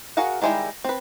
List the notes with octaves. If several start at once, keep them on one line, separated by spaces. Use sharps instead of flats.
F#4 G#4 A#4 F5 F#5
D#3 G3 G#3 E4 G5
C4 B4